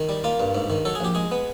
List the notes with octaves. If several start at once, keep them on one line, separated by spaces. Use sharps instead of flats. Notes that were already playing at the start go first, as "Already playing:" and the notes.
Already playing: D#3
G3
A#3 F4
G2
G#2
D#3
F#3 A4
G#4
A#1 G4
G#3 G#4
B3